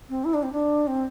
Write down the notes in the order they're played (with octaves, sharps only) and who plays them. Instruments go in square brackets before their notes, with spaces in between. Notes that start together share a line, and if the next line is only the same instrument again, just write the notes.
[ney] C4
E4
D4
C4
D4
C4